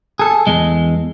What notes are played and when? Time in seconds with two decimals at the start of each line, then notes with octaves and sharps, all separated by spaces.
0.19 G#4 A4
0.47 E2 G#3